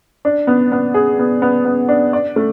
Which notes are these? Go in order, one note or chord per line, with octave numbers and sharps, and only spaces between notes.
D4
B3
B3
G#4
B3
B3
B3
D4
D5
A3